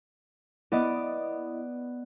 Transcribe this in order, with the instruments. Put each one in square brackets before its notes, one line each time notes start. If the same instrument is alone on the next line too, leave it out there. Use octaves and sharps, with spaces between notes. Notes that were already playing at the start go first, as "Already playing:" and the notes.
[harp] B3 D5 [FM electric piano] E4 D#5